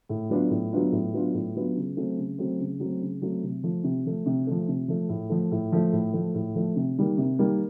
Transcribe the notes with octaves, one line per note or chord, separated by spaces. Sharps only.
A2
F#3 B3 D4 F4
A2
F#3 B3 D4 F4
A2
F#3 B3 D4 F4
A2
F#3 B3 D4 F4
C#3
F#3 A3 C4
C#3
F#3 A3 C4
C#3
F#3 A3 C4
C#3
F#3 A3 C4
C3
F3 A3
C3
F3 A3
C3
F3 A3
C3
F3 A3
A2
F3 A3
A2
F3 A3
A2
F3 A3
A2
F3 A3
C3
D#3 G3 A#3
C3
D#3 G3 A#3